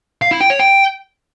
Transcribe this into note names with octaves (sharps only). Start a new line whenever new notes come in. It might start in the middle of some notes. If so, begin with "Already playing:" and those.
F5
E4
G5
C#5
G5